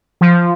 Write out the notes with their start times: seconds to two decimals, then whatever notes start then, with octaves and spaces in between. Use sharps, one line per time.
0.21 F3